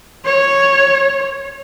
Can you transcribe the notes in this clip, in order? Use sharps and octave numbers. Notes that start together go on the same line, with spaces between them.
C#5